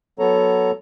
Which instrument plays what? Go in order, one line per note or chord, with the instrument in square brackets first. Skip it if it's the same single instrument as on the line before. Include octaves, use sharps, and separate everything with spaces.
[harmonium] F#3 B3 A4 C#5 A#5